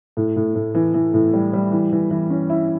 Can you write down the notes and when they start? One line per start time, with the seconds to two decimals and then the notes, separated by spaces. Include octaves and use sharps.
0.17 A2
0.36 A2
0.55 A2
0.75 E3
0.94 E3
1.14 A2
1.34 G3
1.53 G3
1.72 E3
1.92 E3
2.11 E3
2.30 C#4
2.50 E4